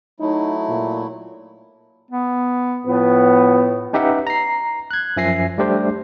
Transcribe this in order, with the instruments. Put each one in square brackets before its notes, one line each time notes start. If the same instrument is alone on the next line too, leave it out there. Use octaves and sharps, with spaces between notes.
[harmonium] F#3 A3 E4 [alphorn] D#4
[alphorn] A#2
[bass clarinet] B3
[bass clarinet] A2 [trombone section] F3 B3
[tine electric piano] C#4 D#4 G4 B4 E5 F#5
A#5 C7
F#6 G#6
F#2 F3 E5 G#5 A#6 C7
G3 A3 D4 G4 C5